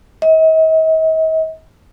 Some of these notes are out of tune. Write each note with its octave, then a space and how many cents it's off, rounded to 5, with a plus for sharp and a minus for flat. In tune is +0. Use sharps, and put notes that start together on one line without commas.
D#5 +45